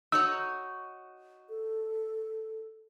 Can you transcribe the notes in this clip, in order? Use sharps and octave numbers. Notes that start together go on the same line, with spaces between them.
D#4 F#4 C#5 E6
A4